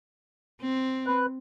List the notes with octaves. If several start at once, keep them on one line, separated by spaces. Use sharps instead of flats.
C4
B4 F#6